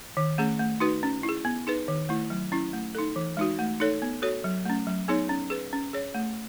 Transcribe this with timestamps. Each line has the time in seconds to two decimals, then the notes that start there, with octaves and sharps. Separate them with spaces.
0.17 D#3
0.38 A3 C#4 G#4
0.59 A3
0.80 D#4 F#4 B4
1.03 C#4
1.23 E4
1.29 G#4
1.45 B3
1.67 D#4 G#4 B4
1.88 D#3
2.09 A3 E4
2.30 F#3
2.52 C#4 E4
2.73 A3
2.95 D#4 A4
3.16 E3
3.37 G#3 D#4 F#4
3.59 A3
3.80 D#4 A4 C#5
4.02 B3
4.22 F#4 A4 C#5
4.44 F#3
4.65 A3 C#4
4.87 F#3
5.08 B3 D#4 G#4 C#5
5.29 C#4
5.50 G#4 B4
5.73 C#4
5.93 G#4 C#5
6.15 A3